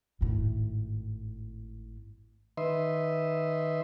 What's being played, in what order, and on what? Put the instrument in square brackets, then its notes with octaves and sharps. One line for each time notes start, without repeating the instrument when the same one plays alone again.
[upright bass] G#1 A2
[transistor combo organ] D#3 B4 D#5 E5 C6